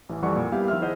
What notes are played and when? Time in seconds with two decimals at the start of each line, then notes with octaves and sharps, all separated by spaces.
0.09 A1 E3
0.22 F2 E3 G3 D5 F#5 C#6
0.36 A#2
0.52 G3 A#3 B3 E4 G4 F5
0.68 D#3 F3 F4 E5 F6
0.81 E4 G#4 C5 D#5 F#5